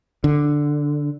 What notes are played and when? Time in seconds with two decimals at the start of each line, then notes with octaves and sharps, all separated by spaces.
0.24 D3